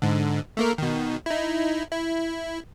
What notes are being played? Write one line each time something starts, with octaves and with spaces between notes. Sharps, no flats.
G#2 D3
A3 A#3 A#4
B2 D#3
D#4 E4
E4